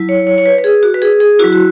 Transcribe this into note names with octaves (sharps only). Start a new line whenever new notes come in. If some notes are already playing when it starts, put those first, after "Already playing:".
Already playing: F#3 E4
C#5
C#5
C#5
B4
B4
G#4
F#4
B4
G#4
G#4
F#3 E4 F#4
F#4